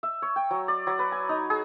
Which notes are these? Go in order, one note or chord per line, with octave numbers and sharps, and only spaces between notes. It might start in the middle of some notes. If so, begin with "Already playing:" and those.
E5
C#5
G5
F#3
D5
F#3
B4
G#5
D#4
G#4